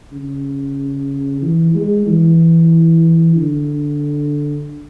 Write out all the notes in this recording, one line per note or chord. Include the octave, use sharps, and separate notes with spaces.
C#3
E3
G#3
E3
D3